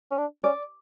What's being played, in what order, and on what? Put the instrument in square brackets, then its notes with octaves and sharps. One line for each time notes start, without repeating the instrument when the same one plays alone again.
[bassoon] C#4
D4
[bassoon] C#4 [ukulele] D5